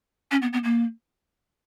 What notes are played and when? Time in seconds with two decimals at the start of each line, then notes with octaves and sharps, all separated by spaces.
0.31 C#4
0.42 B3
0.52 B3
0.64 A#3